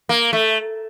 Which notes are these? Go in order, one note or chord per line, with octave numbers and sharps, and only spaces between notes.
A#3
A3